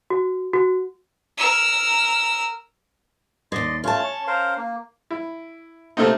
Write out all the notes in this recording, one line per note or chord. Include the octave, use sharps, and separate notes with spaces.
F#4
F#4
A#4 E6
D#2 G#2 D5 D#5 C6
A3 C#4 F4 A5
C#5
A#4 C5 F5
A#3
E4
C3 A3 A#3 C4 D#4